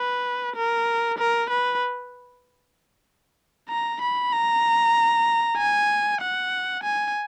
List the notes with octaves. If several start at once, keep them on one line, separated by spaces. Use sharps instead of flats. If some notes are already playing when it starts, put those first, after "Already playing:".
Already playing: B4
A#4
A#4
B4
A#5
B5
A#5
G#5
F#5
G#5